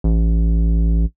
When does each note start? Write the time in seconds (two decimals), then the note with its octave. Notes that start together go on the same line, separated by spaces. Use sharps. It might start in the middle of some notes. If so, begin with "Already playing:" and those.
0.04 A1